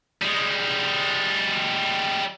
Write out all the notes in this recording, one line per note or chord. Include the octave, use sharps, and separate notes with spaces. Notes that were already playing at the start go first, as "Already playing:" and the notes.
G3 G#3